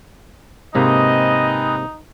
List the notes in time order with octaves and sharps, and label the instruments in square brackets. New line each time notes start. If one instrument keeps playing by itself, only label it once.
[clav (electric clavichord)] G#2 C3 A#3 [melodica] C4 G#4 B4 [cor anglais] D#4 [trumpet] D#5